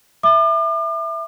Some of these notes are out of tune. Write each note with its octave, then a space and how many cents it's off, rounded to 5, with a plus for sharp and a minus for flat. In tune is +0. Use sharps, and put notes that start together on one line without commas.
E5 +0 D6 +40